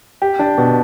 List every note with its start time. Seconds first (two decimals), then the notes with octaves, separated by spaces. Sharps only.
0.22 G4
0.39 D4
0.58 B2